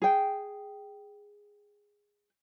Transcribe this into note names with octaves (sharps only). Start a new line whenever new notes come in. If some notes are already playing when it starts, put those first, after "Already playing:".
G#4 G5